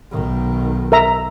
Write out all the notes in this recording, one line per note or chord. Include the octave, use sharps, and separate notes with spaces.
B1 D#3
A#4 E5 A#5